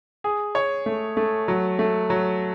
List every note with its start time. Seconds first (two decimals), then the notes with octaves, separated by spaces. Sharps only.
0.24 G#4
0.55 C#5
0.86 A3
1.17 A3
1.48 F#3
1.79 A3
2.10 F#3